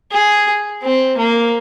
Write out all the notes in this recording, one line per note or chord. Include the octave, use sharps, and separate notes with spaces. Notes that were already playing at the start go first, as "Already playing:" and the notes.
G#4
C4
A#3